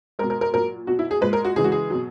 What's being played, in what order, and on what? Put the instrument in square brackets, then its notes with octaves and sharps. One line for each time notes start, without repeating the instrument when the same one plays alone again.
[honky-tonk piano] G#3 A#4
B2
A#4
A#4
A#2 F#3 A#4
B2 F#3 F#4
E4
G#4
A#2 G#3 B4
A#4
F#4
C#3 E3 G#3 G#4
F#4
G#4
B2 F#3